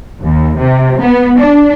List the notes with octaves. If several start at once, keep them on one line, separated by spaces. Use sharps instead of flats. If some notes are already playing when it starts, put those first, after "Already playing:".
D#2
C3
B3
D4